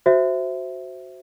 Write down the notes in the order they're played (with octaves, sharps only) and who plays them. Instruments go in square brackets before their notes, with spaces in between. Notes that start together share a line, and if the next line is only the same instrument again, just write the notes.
[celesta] F#4 C5 E5